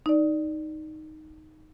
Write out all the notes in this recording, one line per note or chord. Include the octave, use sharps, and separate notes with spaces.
D#4 D5